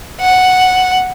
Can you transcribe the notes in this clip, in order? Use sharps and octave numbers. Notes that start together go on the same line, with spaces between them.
F#5